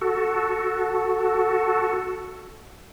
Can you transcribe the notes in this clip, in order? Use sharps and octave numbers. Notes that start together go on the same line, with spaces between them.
F#4 A4